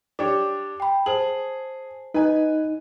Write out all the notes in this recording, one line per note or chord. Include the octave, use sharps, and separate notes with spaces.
D4 G4 C#5 D6
G5 B5
G#4 C5 A5 F#7
D#4 B4 D#5 G#5